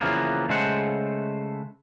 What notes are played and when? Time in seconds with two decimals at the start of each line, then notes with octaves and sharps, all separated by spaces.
0.01 C#3 E3 F3 A#3 B3
0.49 C#3 G#3 A3 C5 F#5